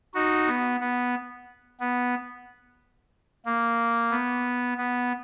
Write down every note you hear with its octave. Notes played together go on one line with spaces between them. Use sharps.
D#4 F#4
B3
B3
B3
A#3
B3
B3